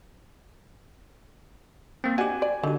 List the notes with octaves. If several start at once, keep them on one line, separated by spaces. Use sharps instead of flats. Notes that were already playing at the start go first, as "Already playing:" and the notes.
A#3 C4
D4 D#4 F#4 G4 G#5
D5
D3 D#3 F#4